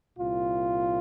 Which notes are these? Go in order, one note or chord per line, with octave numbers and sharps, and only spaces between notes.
C2 A#2 F4